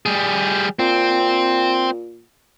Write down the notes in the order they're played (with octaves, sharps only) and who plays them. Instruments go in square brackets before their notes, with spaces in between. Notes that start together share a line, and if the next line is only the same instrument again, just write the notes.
[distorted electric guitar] G3 G#4
[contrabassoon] A#2 [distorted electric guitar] C4